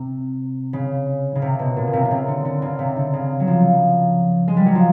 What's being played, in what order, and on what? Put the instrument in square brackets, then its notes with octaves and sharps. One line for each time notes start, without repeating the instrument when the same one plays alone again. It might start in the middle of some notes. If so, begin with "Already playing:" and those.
Already playing: [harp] C3
C#3
C#3
C3
B2
A#2
C#3
C3
C3
C#3
D3
D3
C#3
C3
D3
C#3
F#3
F3
G#3
G3
F#3
F3